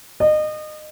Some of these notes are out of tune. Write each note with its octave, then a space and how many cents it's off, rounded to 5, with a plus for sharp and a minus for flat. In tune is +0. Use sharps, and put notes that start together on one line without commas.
D#5 -30